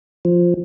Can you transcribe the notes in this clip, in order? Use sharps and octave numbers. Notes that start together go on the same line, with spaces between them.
F3